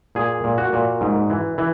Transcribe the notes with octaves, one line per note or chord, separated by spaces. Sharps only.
A#2 G#4
A#2
F#4
A#2
G#2
E3
E3